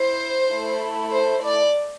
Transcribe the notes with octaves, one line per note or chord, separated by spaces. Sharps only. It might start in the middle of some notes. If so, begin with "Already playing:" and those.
Already playing: E4 C5
A3 E4 A4
C5
D5